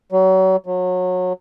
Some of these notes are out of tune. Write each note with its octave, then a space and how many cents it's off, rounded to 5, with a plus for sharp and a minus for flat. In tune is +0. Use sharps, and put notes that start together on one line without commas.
F#3 +35
F#3 -25